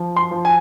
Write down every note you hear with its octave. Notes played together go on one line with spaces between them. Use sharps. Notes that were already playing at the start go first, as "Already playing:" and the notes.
Already playing: F3
C6
F3
G#5